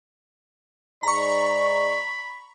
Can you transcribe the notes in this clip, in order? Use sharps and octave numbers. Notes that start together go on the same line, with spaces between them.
G#2 D5 A#5 B5 C#6